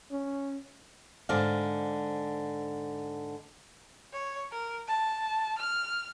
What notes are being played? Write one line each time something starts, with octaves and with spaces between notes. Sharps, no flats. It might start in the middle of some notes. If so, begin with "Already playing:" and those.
C#4
G#2 D3 C5 D5 F5
C#5
A#4
A5
F6